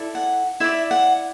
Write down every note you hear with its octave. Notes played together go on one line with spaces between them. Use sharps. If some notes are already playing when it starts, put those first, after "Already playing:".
Already playing: E4 A4 D5
F#5
E4 D5 E5
F#5